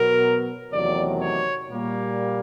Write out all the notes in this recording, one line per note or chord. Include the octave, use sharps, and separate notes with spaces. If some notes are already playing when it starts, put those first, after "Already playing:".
Already playing: B2 F#3 B3 A#4
E2 C3 D#3 F#3 A3 D5
C#5
A#2 G3 A#3